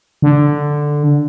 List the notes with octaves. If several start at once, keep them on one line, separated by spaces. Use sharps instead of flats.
D3